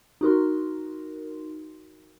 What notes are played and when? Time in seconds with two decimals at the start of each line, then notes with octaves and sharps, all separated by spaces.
0.21 D#4 F#4 A#4 C6